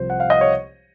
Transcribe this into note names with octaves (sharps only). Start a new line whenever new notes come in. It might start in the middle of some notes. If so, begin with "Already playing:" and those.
Already playing: C2 C3 F3 C5
F#5
F5
D#5
C#5